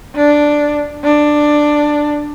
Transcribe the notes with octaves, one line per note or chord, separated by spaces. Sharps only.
D4
D4